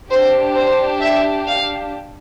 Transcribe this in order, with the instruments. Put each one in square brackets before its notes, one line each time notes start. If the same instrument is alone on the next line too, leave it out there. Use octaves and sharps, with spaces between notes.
[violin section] D4 G4 C5
C5
E5
F5